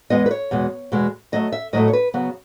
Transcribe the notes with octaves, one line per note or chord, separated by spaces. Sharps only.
E2 D#3 G#3 B3 D#5
B4
C#5
E2 B2 G#3
E2 B2 G#3
A2 F#3 A3 D#5
E5
A2 F#3 A3 D#5
C#5
B4
C#3 F#3 B3